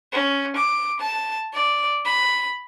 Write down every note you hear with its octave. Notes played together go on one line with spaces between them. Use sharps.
C#4
D6
A5
D5
B5